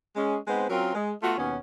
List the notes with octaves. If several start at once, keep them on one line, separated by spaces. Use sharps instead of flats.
G#3 C#4
G#3 B3 C4 D#4 B4 C5
F#3 C4 C#4 F4 A#4
G#3
A3 B3 F4 F#4
D#2 B2 B3 C#4